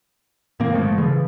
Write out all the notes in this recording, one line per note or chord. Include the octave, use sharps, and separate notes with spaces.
A2 D#3 A#3 C4
G1 F3 G#3 A3
C#3 E3 F3